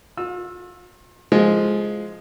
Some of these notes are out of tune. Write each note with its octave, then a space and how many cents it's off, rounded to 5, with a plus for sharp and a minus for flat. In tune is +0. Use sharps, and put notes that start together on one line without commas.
F4 +40 E6 +0
F3 +0 G#3 +5 F4 +0